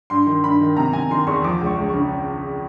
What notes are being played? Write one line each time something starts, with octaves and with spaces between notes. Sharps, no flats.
G2 C6
D#3
G2 B5
D#3
C3 A#5
C3 G#5
D#3 C6
E2 C#6
F3 D6
C#2
C#6
C#2
C#3 C#6